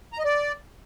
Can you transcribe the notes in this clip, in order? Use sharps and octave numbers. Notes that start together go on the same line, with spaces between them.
A#5
D#5
D5